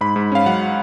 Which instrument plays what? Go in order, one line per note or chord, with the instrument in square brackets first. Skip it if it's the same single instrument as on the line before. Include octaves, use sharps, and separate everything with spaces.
[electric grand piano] G#2 B5
G#2
C#4 F5
F#3 F#5